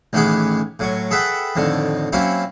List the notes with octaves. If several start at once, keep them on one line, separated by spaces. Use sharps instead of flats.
A1 D#3 E3 B3 G#4 D6
A2 F#3 C#6
G#4 A4 B4 E5 F#5 G5
F2 A2 D3 D#3
F#3 A#3 C4 C#4 E4